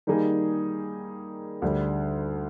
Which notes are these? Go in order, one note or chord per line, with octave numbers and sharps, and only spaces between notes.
D#3 G3 A#3 D#4 G#4
D2 D3 G3